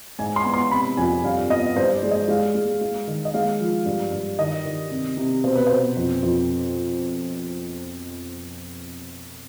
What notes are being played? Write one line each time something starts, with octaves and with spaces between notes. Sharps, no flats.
G#2 G#5
C6
B3
C6
C3 B5
F2 G#5
G2 F5
B3 D#5
G2 C5
D5
G#3
D#5
G#3 F5
G#3
G#3
D#3
D#5
G#3 F5
F3
G2
G2
D#3 D#5
D#3
C3
C3
B2 C5
B4
B2 C5
F2
F2